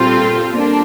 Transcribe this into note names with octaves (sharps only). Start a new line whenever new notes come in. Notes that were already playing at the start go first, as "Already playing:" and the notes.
Already playing: A#2 G3 C4 F4 A4
A#3 D4